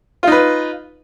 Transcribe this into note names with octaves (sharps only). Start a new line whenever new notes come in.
D#4 F4 B4